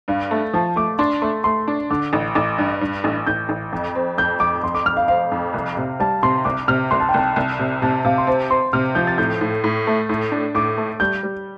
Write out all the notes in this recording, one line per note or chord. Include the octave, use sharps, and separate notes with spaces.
G2 F5
A3
F3 A5
A3 D6
D4 C6
A3 C6
A3 C6
D4
D3 D6
A1
A1 D6
G2
G2
A1
A1 G6
A1
F2
C4
F2 G6
F2 D6
F2 C6
D6
F2 F6
F5
C4 F5
F2
C2
C3
G3 A5
C3 C6
C2 D6
C3 F6
C2 C6
A5
G5
C2 A5
C2
C3
C3 A5
C3 F5
C6
C4 A5
C4 C6
C3 F6
F3 G6
A6
A2 G6
A2
A2
A3
A2
D4
A2 D6
A3
G3 G6
G3